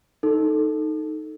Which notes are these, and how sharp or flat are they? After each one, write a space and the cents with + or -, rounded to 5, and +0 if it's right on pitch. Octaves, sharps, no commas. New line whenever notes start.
D#4 +0 A4 +0